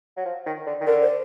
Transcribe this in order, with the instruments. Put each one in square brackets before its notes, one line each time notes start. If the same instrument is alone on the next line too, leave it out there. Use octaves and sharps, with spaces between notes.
[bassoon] F#3
F3
D#3
D3
D#3
[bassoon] D3 [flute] A#4
[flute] C5